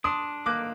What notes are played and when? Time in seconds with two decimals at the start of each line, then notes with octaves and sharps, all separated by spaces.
0.04 D4 C6 D#6
0.46 A#3 D6 F#6